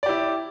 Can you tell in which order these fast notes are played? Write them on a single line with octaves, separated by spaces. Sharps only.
D5 G4 E4